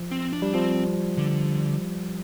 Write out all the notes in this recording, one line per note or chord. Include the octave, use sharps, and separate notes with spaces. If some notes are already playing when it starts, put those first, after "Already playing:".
Already playing: F3
C4
D4
G3
F3 C4
D3